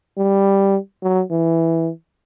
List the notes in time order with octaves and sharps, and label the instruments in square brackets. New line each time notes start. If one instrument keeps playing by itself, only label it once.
[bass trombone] G3
F#3
E3